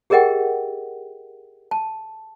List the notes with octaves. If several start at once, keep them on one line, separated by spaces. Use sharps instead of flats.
G4 G#4 A#4 D#5 F#5 G5
A5